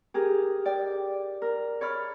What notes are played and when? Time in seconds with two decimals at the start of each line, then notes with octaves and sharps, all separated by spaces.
0.14 G4 G#4 A#4
0.65 D5 G5
1.42 A#4
1.81 C#5 D5 B5 F6